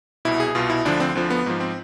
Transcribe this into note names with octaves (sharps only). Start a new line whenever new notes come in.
C2 B2 E4
G#4
C2 B2 F4
E4
D2 D3 F3 D4
C4
D2 D3 F3 C4
B3
G#2 F3
C4